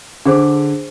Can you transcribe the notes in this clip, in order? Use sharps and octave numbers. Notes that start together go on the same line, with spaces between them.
D3 D4 G#4 C5 D6